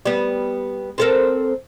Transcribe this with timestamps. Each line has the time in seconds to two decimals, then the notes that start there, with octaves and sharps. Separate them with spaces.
0.06 G3 B3
0.98 C4 A4 A#4